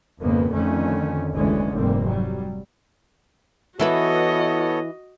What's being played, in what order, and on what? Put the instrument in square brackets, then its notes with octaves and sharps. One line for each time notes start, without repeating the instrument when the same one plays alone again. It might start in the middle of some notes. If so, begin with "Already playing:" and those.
[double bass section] G#1 F2 C#3 A#3 B3
F2 D3 D#3 A3 C#4
F#1 D2 D3 E3 G#3 C#4
F1 G#2 G3 A#3 C4
F#3 G3
[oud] E3 E4 B4 [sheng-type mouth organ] B3 A4 C#5 [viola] F#4 D#5